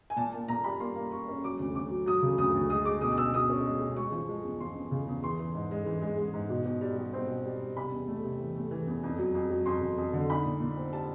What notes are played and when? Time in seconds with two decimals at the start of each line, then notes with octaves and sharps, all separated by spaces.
0.10 G#5
0.17 A#2 A5
0.32 A#3 A5
0.48 A#2 A#5
0.64 G3 B5
0.80 A#3 C6
0.96 A#3
1.11 G3 C#6
1.28 C#4
1.44 F#3 D6
1.59 D2
1.75 D2 D6
1.91 F#3
2.06 F#3 D#6
2.22 C#3
2.38 D2 D#6
2.55 D2
2.70 G#3 D#6
2.85 G#3 D6
3.01 B2 D#6
3.12 D#6
3.18 B2 E6
3.34 B2 D#6
3.50 C#4
3.65 G#3
3.80 B2
3.96 G#3 C#6
4.12 F3
4.28 G#3
4.44 E2
4.60 F3 C6
4.75 E2
4.91 C#3
5.07 E2
5.23 E3 C6
5.39 E3
5.55 G#2
5.71 G#3
5.86 E3
6.02 G#3
6.18 G#3
6.34 G#2
6.49 B2
6.65 B2
6.81 G3
6.98 G3
7.14 C4
7.28 B2
7.45 G3
7.61 G3
7.76 C3 B5
7.92 E2
8.08 A3
8.24 C3
8.40 E3
8.55 A3
8.71 E3
8.87 E2
9.03 F2
9.19 F#3
9.34 F2
9.50 F#3
9.66 F2 C6
9.82 F2
9.98 F2
10.13 D3
10.29 D#4 B5
10.45 A#2
10.60 A#2
10.77 C4
10.93 G3 A5